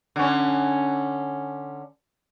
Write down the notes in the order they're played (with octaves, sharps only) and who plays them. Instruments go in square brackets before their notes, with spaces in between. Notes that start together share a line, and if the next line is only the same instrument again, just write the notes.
[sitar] D3 C#4